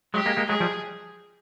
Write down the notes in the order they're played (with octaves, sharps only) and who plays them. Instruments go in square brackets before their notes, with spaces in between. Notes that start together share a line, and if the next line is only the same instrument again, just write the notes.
[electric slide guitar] F#3 G#3 [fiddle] G4
[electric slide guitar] G#3 A#3
G#3 A#3
[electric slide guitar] F#3 G#3 [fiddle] G#4
[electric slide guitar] F3 G3